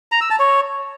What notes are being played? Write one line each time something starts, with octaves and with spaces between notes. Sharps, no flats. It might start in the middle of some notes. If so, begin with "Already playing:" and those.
A#5
E6
A5
C#5